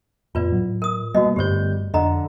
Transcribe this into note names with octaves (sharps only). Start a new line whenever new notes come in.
F2 A2 B3 F4 B4 D5
A2 F#3
A#4 D#6
B2 G3 A3 A#3 F#4 D#5
G1 G2 G3 A3 G4 C5 G6
F2 D3 D#5 A#5